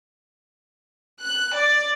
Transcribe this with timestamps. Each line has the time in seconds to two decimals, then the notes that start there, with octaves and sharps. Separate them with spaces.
1.20 F#6
1.54 D5